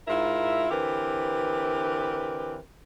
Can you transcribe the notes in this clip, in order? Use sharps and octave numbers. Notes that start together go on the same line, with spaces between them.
G#2 E4 F4 A#4 E5
D3 E3 C4 G4 A#4 B4